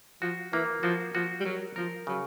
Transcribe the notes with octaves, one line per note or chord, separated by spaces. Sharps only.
F3 F#4
E3 A#3
F3 F#4
F3 F#4
G3
F#3 A#4
F3 A#4
C#3 F#3